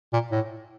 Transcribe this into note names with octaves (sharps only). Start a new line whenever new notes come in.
A#2
A2